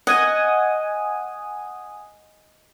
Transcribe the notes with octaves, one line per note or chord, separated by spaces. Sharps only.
D#5 F#5 G#5 D#6